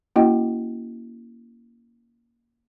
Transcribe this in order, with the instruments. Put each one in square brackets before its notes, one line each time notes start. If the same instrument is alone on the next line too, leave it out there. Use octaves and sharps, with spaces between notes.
[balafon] A#3 C#4 E4 F#4 D#5 G5